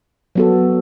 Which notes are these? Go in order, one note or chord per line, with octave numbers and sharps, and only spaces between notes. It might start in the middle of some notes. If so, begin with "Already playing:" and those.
F#3 B3 F#4 A4